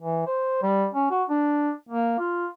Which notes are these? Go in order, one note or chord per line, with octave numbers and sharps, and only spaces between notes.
E3
C5
G3
C#4
F#4
D4
A#3
F4